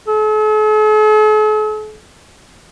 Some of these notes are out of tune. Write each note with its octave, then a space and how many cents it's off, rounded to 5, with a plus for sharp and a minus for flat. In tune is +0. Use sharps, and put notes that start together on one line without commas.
A4 -45